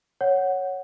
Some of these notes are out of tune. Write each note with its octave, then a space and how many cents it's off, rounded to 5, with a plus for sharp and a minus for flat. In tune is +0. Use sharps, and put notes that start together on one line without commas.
C#5 +0 F#5 +0